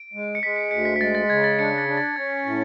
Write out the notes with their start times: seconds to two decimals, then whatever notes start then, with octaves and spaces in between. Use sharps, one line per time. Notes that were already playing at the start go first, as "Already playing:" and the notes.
Already playing: D7
0.13 G#3
0.35 C#7
0.42 G#3 B6
0.56 C#7
0.71 D2 C#7
0.85 B6
0.96 B6
1.00 G#3 A6
1.15 A6
1.30 C#3 G#6
1.44 A6
1.59 D4 C#7
1.78 A6
1.88 D4
1.97 A6
2.16 C#4 G#6
2.45 A2